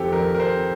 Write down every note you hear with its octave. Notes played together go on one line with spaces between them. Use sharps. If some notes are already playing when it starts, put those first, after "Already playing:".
Already playing: F2 D#3 C4 G4 A4
F2 A#4
A#4
C4 C5